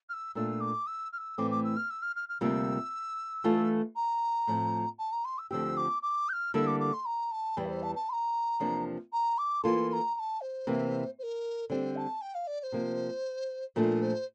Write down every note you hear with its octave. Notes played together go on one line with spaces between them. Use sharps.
F6
E6
A#2 A3 D4 F4 E6
D6
E6
F6
E6
A2 E3 A3 C4 D6
D6
E6
F6
E6
F6
F6
F6
D2 C3 G3 A#3 F4 E6
E3 A3 D4 F4 A4
A#5
A2 F3 C4
A5
A#5
C6
E6
D2 D3 F3 C4 G4 E6
D6
D6
G6
F6
D3 G3 A#3 E4 A4 E6
D6
D6
C6
A#5
A5
E2 E3 G3 G5
A#4
C5
A5
A5
C6
A#5
E2 C3 F3 A#3 D4
A#5
D6
E3 A#3 F4 A4 C6
C6
A#5
A#5
A5
C5
C3 E3 A#3
C5
A#4
D3 G3 C4 G4 C5
A5
G5
F5
D5
D5
C5
C3 F3 A#3
A#2 F3 A3 D4 A#4
C5